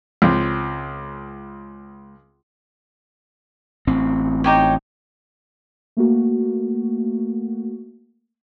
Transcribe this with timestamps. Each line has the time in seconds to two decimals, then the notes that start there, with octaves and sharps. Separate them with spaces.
0.22 C#2 C4
3.87 A1 C4
4.44 D#4 G4 C#5
5.97 A3 A#3 F#4